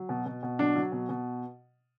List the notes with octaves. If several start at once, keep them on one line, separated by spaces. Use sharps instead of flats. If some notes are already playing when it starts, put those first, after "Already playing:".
Already playing: F#3
B2
B2
B2
F#3 D4
F#3
B2
B2